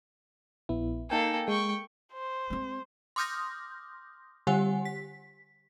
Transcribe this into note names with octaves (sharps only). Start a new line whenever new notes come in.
A#1 B3 E4
A#3 D#4 A4 G5 G#5
G#3 G5 C#6
C5
G#3 C4
C6 D6 D#6 F6 G6 A#6
D3 G3 G4 F#5 G#5
B6